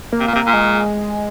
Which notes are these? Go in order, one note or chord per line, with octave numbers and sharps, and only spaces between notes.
A#3
C3
A#2
C3 A#3
A#2
G#3